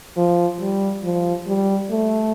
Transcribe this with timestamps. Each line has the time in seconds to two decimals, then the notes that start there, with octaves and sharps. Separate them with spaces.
0.17 F3
0.60 G3
1.04 F3
1.47 G3
1.91 A3